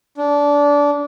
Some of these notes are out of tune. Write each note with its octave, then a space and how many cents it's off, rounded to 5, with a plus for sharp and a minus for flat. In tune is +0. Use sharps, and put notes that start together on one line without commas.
D4 -20